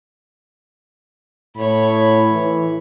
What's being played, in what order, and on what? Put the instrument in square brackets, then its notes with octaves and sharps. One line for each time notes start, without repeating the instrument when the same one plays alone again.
[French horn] A2 [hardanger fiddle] C#5 B5
[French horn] E3